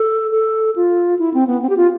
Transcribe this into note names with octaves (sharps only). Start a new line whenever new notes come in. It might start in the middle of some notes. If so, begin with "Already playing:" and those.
Already playing: A4
A4
F4
E4
C4
B3
C4
G4
F4